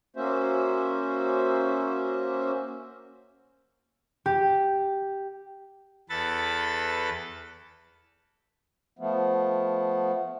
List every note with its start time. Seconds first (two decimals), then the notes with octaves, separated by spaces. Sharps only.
0.16 A#3 C#4 F#4 C5 E5
4.26 G4
6.10 E2 A4 B4 A6
8.99 F3 A3 B3